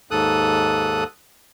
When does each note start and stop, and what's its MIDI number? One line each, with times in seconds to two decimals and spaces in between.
0.11 1.04 39
0.11 1.04 44
0.11 1.04 69
0.11 1.04 87
0.11 1.04 90